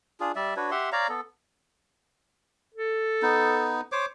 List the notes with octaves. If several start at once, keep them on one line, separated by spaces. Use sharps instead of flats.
D4 F4 G#4
G3 D5 E5
D4 F#4 B4 C#5
G4 E5 F#5 C6
C#5 D5 F5 A#5
B3 A4
A4
B3 D#4
C5 C#5 D6